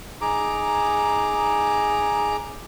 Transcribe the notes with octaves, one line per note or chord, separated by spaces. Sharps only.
D#4 G#4 A#5 D6